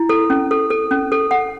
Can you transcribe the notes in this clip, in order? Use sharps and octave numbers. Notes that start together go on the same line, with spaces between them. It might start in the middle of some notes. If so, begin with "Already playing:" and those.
Already playing: E4
A4
C#4
A4
A4
C#4
A4
F#5